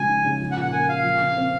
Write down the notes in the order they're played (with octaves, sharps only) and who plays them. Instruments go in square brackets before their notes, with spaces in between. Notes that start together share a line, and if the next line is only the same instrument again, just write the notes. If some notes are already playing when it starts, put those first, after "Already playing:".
Already playing: [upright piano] C#3 F3 G#3 [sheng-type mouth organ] G#5
[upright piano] D#4
C#3
F3
[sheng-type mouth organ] F#5
[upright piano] A#2
[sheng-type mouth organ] F#5
[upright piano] A#3 [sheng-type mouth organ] G#5
[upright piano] A#2 [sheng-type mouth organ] F5
[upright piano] F3
C#3
C4